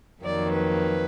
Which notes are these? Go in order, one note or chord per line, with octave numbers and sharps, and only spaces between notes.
F2 D#3 F#3 A#3 D5
B4